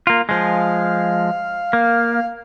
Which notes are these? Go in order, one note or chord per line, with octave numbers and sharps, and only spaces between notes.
A#3 F4
F3 G#3 F5
A#3